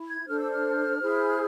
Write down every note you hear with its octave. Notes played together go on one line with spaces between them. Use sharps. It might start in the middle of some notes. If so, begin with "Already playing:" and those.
Already playing: E4
G#6
D4 A4 C5 F6
E6
F6
E4 G#4 C5